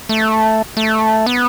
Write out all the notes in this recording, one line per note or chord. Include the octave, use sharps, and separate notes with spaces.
A3
A3
B3